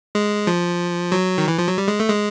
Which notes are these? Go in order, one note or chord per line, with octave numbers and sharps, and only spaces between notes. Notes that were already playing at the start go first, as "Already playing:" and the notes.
G#3
F3
F#3
D#3
E3
F3
F#3
G3
G#3
A3
G#3